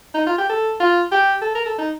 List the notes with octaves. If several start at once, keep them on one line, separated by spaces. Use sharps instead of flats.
D#4
F4
G4
A4
F4
G4
A4
A#4
A4
D#4